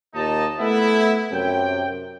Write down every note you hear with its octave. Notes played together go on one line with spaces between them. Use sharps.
D#2 A#2 D#4 D#5 A5
A3 B3 E4
F#2 C3 G5